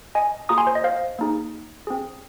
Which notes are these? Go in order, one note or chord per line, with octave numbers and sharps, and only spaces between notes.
D#5 G#5
A#3 F4 G#4 A#5 D#6
G#5 C6
C5
D#5
C5 F5
A#3 D#4 G#4
C4 G#4